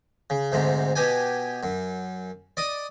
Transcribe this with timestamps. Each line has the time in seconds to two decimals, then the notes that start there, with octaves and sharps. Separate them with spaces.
0.30 C#3
0.52 D2 G#2 C3
0.96 B2 G4 G#5
1.63 F#2
2.57 D5 D#5 D#6